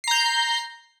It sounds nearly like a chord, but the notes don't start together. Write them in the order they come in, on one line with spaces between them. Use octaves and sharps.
C7 A#5 G6